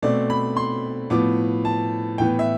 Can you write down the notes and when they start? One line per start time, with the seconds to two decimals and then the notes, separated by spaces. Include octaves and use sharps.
0.02 B2 A3 C4 D5
0.30 B5
0.57 C6
1.10 A2 F3 B3 D6
1.65 A5
2.18 A2 E3 B3 G5
2.39 E5